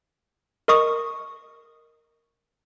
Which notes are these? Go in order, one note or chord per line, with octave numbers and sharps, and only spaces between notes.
A#4 D#5 C#6 D#6